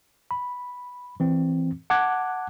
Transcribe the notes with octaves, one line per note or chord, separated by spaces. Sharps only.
B5
E3 C4
F#5 A5 D6 F#6 G#6